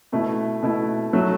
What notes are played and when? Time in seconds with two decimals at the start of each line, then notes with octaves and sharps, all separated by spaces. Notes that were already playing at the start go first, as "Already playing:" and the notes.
0.12 B2 A3 E4
0.62 B2 A3 E4
1.13 F#3 A3